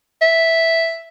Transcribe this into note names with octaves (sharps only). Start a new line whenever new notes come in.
E5